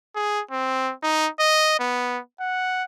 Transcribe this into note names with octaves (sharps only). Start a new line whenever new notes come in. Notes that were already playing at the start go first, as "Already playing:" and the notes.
G#4
C4
D#4
D#5
B3
F#5